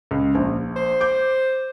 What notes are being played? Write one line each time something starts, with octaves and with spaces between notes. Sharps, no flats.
C#2
A#1
C5
D6 G6